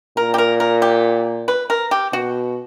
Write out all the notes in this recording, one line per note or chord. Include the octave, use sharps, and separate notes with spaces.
A#2 A#4
G4
A#4
A#4
G4
B4
A#4
G4
B2 F#4